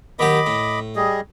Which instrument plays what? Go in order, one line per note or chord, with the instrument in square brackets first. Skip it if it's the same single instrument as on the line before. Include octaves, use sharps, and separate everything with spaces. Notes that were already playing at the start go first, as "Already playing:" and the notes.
[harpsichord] D#2 F#3 G4 [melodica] D#5 B5 D6
[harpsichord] A2
[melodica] G3 G#4 D#5